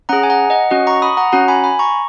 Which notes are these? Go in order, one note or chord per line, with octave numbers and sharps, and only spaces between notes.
C#4 G#4 F#5 A#5
G#5
F#5 A#5
D#5 F#5
C#4 F#4 D#5 F#5
A#5 C#6
B5 D#6
F#5 A#5
C#4 F#4 F#5 A#5
G#5 B5
G#5 B5
A#5 C#6